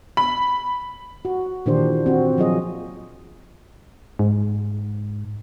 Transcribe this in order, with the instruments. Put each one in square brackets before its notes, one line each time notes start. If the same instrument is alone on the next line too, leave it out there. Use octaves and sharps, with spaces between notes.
[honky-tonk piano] B5
[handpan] F#4
A#2 D#3 E3 D4 G4 C5
C4 F#4
F3 F#3 F4 G#4 D#5
[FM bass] G#2